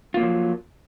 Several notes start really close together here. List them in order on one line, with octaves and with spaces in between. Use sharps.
F4 A#3 F#3 F3